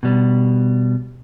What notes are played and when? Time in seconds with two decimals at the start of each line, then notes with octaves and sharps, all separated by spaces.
0.03 B2 G3